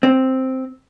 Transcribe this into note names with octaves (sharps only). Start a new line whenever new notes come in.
C4